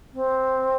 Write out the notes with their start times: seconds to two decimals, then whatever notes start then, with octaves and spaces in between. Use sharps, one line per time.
0.13 C4